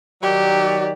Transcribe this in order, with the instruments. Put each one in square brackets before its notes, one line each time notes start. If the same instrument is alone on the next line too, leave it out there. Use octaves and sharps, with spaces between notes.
[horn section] D#3 F#3 D5 [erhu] G4